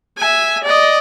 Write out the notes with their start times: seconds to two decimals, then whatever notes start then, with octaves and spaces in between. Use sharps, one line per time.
0.17 E5 G#5
0.63 D5 D#5